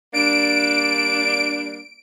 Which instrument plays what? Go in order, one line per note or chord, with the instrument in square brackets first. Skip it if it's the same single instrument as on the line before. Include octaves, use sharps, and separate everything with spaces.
[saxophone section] G3 A#3 D4 [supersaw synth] D7